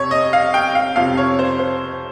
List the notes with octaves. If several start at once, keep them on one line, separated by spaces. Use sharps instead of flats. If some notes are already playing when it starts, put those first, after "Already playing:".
Already playing: F2 C3 C#5
D#5
F5
G5
F5
F2 C3 F3 F5
C#5
C5
C5